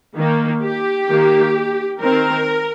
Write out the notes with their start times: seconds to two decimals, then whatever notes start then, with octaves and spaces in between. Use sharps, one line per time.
0.16 D#3 A#3
0.62 G4
1.09 D#3 A#3
2.00 D#3 C4 A#4